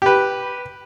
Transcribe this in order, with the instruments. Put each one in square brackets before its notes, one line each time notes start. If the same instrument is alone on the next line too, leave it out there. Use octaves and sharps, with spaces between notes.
[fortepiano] G4 B4